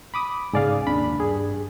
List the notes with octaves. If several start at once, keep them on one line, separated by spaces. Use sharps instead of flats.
B5 D6 D#6
G#2 C#3 G#4 D5 F5
D#2 D4 B5
G2 G#4